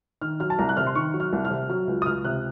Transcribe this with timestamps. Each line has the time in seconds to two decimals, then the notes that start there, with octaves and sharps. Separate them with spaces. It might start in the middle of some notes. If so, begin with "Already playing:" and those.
0.22 D#3 F6
0.40 F#3 F6
0.50 A5
0.59 C2 A#5
0.69 F#6
0.77 C3 F6
0.87 C6
0.95 D#3 C#6
1.14 F#3
1.20 F6
1.33 C2
1.45 F6
1.50 C3
1.69 F#3 F6
1.87 C#2
2.02 D#6
2.06 C#2 F6
2.25 C3 F#6